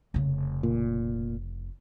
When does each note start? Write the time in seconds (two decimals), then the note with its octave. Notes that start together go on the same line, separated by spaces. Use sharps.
0.14 F1 C#3
0.63 A#2